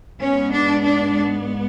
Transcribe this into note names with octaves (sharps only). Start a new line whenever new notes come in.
G#2 G#3 B3 C#4
D4
D4